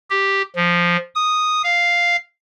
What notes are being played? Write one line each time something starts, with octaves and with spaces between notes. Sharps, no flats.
G4
F3
D#6
F5